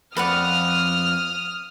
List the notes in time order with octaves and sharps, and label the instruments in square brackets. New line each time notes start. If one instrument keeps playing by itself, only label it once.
[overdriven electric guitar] F2 [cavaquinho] B4 D5 F#5 [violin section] D#6 F6